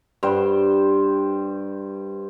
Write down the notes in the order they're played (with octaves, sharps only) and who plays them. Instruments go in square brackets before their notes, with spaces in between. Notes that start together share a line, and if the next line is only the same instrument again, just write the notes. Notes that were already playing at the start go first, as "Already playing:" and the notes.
[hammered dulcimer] G2 C5 G5